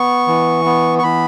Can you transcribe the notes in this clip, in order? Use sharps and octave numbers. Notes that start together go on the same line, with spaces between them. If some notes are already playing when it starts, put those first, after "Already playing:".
Already playing: B3 C#6
E3
B3
C#6
E3 B5